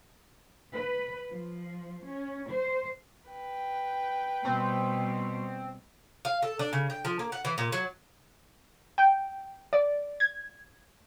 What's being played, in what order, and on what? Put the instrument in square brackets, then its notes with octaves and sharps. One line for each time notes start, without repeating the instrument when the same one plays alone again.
[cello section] B4
F3
C#4
C5
[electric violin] B4 G5
[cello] B2 G3 [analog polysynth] C4
[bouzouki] F5
A4
D4
C#3
G5
F3
A#3
F#5
E3
A#2
F#3
[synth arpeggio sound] G5
D5
G#6